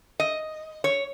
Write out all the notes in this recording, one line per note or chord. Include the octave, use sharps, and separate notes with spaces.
D#5
C#5